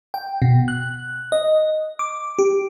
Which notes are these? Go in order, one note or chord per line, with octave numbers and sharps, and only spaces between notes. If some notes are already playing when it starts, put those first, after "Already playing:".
G5
B2
F#6
D#5
D6
G4